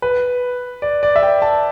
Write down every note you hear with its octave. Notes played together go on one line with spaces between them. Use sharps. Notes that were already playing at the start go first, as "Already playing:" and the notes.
B4
D5
D5
E5
G5
A5